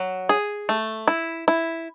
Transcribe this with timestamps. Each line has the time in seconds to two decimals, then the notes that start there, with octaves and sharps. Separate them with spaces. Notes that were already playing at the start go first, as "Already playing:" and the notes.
Already playing: F#3
0.29 G#4
0.69 A3
1.08 E4
1.48 E4